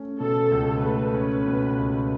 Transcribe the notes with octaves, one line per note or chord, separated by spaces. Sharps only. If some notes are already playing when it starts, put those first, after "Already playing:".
Already playing: A3 C#4
B2 A4
C#2
A3 B4
C#4
B2
C#2